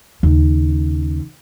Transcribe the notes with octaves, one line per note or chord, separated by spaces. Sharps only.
D#2 C#3